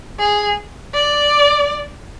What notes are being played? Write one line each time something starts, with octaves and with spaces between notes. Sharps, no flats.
G#4
D5